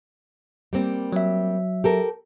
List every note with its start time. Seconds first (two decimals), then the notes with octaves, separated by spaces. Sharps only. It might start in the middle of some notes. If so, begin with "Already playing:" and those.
0.73 G3 A#3 C4
1.13 F#3 E5
1.84 G4 A4 A#4